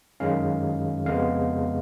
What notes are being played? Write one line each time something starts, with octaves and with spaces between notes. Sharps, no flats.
F#2 D#3 G#3 C#4 F5
F2 C#3 G#3 B3 F5